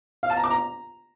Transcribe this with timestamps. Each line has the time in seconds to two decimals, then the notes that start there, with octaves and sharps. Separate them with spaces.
0.23 F5
0.30 A5
0.37 A#5
0.44 D6
0.50 A#5